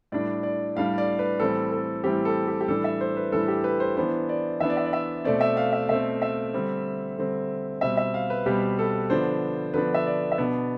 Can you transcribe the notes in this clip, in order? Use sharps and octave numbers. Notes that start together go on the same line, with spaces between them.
A2 G3 D4 D5
D5
A2 G3 D4 F5
D5
B4
A2 E3 G3 C4 A4
A4
A2 E3 G3 C4 G4
A4
G4
G4
A2 E3 G3 D4 A4
E5
C5
B4
A2 E3 G3 D4 A4
G4
B4
C5
E3 B3 D4 C5
D5
E3 B3 D4 E5
D5
E5
D5
E5
B2 A3 C4 D5
E5
F5
E5
B2 A3 C4 E5
E5
D3 G3 C4
D3 G3 C4
B2 G3 C4 E5
E5
F5
B4
B2 G3 C4 G4
A4
D3 F3 B3 D4 C5
D3 F3 B3 D4 B4
E5
D5
E5
B2 B3 D4 D5